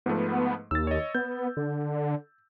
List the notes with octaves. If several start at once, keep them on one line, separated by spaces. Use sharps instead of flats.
G#2 F3 A3 B3
D#2 E6 A6
C#5 D#5
B3 G6
D3